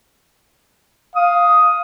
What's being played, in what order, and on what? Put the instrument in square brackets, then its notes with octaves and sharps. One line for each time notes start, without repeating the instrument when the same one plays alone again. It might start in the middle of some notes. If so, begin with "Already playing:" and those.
[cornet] F5 [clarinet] D#6